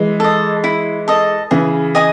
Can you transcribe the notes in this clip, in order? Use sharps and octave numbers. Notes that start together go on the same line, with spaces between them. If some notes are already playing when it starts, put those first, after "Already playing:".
Already playing: E3 G#3
A4 D#5
E4
A4 D#5
C#3 E3 G#4
D#5 G#5 D#6